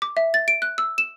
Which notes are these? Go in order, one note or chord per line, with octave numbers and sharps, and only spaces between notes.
D6
E5
A6
D7
F#6
E6
E7